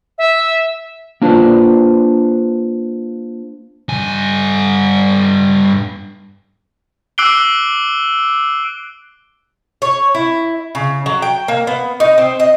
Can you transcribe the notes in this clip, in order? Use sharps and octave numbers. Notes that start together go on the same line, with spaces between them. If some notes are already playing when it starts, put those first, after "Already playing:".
E5
A#3 D4 F4 B4 C5
G2 G#5
D6 E6 F#6 C7 D7 G7
C#5
E4
C#3
F#3
G5
A#3
B3
D#4
C4
D#5